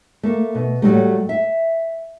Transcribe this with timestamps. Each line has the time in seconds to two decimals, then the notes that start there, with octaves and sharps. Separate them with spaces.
0.23 A3 A#3
0.55 B2
0.82 A2 F#3 G3 A3
1.29 E5